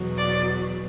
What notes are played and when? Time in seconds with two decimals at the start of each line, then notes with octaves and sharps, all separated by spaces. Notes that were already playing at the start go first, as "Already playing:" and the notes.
Already playing: E2 B2 F#3
0.18 D5